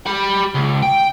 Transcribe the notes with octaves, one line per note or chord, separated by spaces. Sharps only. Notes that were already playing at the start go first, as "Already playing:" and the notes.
G4 B5
C#2
G5